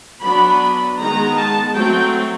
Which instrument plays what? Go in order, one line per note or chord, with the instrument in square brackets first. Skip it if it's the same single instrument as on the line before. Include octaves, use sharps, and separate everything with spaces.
[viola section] F#3 B3 D4 B5
D#3 G#3 B3 A#5
A5
F#3 A3 C4 G5